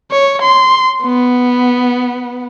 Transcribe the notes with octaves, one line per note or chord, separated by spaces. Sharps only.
C#5
C6
B3